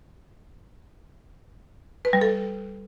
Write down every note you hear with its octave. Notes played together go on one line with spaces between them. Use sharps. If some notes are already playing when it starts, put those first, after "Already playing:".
B4
G3
A4